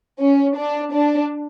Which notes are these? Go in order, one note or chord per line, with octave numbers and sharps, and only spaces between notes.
C#4
D4
D4